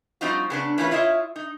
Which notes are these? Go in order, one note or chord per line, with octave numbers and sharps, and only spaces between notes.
F3 G3 C4 D#4 F4 F#4
C#3 B3 D4
E3 A3 C#4 D4 F4 B4
E4 F4 C#5 D#5 E5
D#4